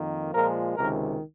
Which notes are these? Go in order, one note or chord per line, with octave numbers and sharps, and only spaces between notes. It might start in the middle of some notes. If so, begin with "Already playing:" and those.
Already playing: F2 D#3 A#3
A#2 F3 G#3 A#4
C#2 C3 D#3 A#4